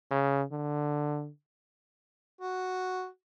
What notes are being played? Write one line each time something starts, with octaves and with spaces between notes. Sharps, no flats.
C#3
D3
F#4